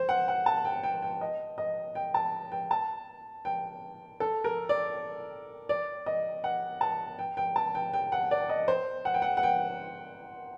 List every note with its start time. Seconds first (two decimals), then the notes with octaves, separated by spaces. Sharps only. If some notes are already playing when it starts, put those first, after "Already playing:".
Already playing: C5
0.09 F#5
0.28 F#5
0.46 A5
0.65 G5
0.84 G5
1.02 G5
1.21 D#5
1.58 D#5
1.95 G5
2.14 A5
2.52 G5
2.71 A5
3.45 G5
4.20 A4
4.44 A#4
4.69 D5
5.69 D5
6.06 D#5
6.44 F#5
6.81 A5
7.19 G5
7.37 G5
7.56 A5
7.75 G5
7.94 G5
8.12 F#5
8.31 D5
8.49 D#5
8.68 C5
9.05 F#5
9.14 G5
9.22 F#5
9.37 F#5
9.43 G5